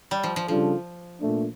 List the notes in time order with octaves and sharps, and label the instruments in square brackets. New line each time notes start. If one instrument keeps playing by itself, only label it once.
[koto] G3
F3
F3
[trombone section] C#3 G3 D4 F4 A4 [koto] F3
[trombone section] A#2 A3 D4